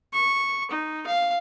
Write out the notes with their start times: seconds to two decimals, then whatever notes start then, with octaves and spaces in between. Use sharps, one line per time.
0.13 C#6
0.71 D#4
1.06 F5